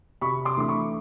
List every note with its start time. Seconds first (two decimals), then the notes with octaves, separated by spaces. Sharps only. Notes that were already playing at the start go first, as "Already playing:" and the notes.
0.21 C3 B5 C#6
0.45 C6 D6
0.57 E3 A3 D4 D6
0.69 B5 C#6